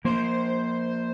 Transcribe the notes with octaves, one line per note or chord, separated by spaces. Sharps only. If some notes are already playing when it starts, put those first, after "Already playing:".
F3 A#3 C5